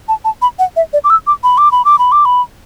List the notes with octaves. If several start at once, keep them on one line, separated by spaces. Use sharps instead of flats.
A5
A5
B5
F#5
E5
D5
D6
E6
D6
B5
D6
B5
D6
B5
D6
B5